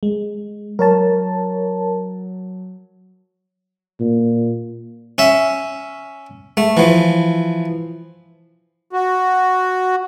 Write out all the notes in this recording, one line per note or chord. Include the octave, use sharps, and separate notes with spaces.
G#3
F#3 A#4 C#5 A5
A#2
C#4 E5
A3
E3 F3
F#4